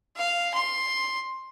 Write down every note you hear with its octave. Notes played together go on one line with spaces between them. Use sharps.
F5
C6